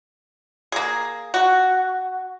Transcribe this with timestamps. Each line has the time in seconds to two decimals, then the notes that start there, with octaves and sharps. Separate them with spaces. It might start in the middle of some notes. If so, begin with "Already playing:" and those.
0.72 A#3 G#4
1.34 F#4